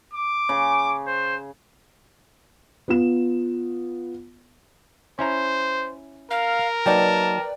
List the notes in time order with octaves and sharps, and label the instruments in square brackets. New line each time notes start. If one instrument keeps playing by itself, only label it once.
[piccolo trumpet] D6
[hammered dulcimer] C#3
[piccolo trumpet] C5
[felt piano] B3 F4 E7
[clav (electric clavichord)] C#4 E4 A#5 [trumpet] C5
[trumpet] A#4 [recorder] F5
[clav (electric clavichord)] F#3 A#3 D#4 [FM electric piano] B4 D5 G5 [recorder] A5